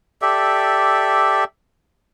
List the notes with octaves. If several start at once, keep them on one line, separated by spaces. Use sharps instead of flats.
G4 A4 D5 E5